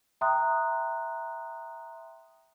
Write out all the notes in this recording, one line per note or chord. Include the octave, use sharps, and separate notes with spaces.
E5 G5 A#5 C6 D#6 F#6